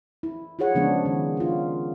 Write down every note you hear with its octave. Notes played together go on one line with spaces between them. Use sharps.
E4
F4 F#4 G#4 C#5 F#5
C#3 F3 G#3 B3 D4
D#3 D4
D4 F4